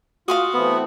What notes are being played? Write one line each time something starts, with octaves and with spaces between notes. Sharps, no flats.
F4 F#4 F5 C6 D#6
E3 A3 B3 C4